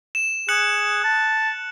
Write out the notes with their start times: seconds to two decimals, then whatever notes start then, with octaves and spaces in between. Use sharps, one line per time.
0.15 E7
0.49 G#4 F#6 C#7 F#7
1.04 A5